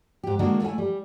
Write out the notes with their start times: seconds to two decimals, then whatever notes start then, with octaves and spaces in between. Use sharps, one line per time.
0.23 G#2 G4
0.39 D3 D#3 G#3 A#3 D4 F#4
0.62 A3 E4 F5 G#5
0.78 G3